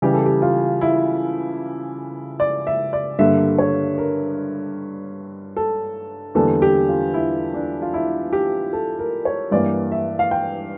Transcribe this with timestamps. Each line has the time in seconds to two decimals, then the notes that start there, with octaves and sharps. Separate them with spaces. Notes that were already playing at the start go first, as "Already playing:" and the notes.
0.02 C#3 E3 G3 G4
0.14 A4
0.26 G4
0.42 F4
0.81 E4
2.40 D5
2.67 E5
2.93 D5
3.19 G2 D3 G3 A#3 E5
3.59 C#5
3.98 A#4
5.56 A4
6.35 E2 D3 G3 A#3 A4
6.62 G4
6.89 F4
7.14 E4
7.54 D4
7.82 F4
7.94 E4
8.33 G4
8.73 A4
8.99 A#4
9.25 C#5
9.51 G2 E3 A#3 D5
9.92 E5
10.19 F5
10.31 G5